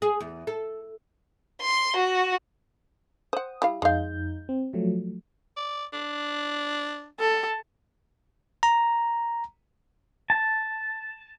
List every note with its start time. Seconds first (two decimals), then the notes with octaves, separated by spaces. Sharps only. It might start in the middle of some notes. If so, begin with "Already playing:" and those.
0.02 G#4
0.20 E2
0.47 A4
1.62 C6
1.96 F#4
3.33 C5 F#5 D#6
3.62 G3 E4 F5
3.82 F2 G#3 D#4 F5 G6
4.49 C4
4.73 F3 F#3 A3
5.57 D5
5.93 D4
7.20 A4
8.63 A#5
10.30 A5